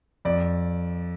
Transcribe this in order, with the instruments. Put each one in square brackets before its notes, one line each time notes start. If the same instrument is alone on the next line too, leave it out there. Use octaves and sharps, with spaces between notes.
[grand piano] F2 D5